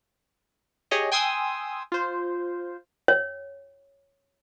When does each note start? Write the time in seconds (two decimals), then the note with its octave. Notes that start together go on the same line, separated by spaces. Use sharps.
0.91 G4 G#4 C#5 D#5
1.12 G5 G#5 C6 D#6 E6
1.92 F4 C5
3.08 C#5